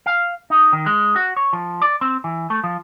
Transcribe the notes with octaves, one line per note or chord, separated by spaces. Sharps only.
F5
D#4
D#3
G#3
F#4
C#5
F3
D5
C4
E3
A3
F3